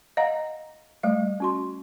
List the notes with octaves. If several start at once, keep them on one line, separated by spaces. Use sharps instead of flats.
D#5 F5 F#5 A#5
G3 A3 F5
C#4 F#4 C6